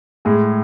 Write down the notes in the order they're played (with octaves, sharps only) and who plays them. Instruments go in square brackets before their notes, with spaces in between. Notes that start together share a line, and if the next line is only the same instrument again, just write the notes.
[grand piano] A2 G#3 G#4